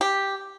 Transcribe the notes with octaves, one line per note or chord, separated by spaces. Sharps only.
G4